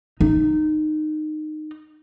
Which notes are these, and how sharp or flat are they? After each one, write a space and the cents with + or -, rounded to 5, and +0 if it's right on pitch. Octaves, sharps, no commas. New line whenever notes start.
D#4 -20